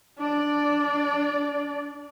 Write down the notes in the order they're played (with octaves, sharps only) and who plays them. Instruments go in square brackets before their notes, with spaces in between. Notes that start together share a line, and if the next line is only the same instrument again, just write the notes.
[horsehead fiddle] D4 D5